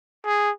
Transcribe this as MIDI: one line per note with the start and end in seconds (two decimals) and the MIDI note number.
0.25 0.50 68